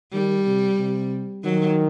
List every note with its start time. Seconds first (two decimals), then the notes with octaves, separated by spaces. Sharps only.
0.12 D#3 G3
0.45 C3
0.78 C3
1.44 D#3 F#3